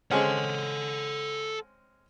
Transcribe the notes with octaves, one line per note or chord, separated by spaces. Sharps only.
G#3 C4 C#4 A4 F#5